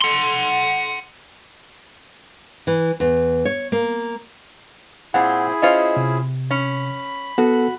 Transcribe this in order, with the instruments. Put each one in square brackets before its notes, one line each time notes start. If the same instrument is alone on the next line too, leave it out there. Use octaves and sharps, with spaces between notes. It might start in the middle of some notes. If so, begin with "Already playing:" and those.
[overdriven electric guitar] F#5 C6
[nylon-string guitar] E3
E2
C#5
A#3
[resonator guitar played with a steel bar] A#2 C4 [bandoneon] E4 G#4 [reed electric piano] F#5
[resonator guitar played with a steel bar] C#4 F4 C5 [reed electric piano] D#5
[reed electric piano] C3
[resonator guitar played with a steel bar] C#4 [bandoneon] B5
[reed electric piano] B3 A4 [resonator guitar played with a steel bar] F#4